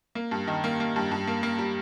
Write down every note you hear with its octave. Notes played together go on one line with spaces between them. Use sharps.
A#3
G2
D#3
A#3
A#3
G2
G2
A#3
A#3
G3